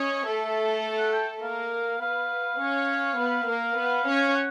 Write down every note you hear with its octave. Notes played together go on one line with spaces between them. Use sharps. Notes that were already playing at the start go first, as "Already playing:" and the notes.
Already playing: C#4 C#5 D#5
A3 A4 E5
F#5
G5
A#3 A#4 F5
B3 B4 F5
C#4 C#5
B3 B4
A#3 A#4
B3 B4
C#4 C#5
F#5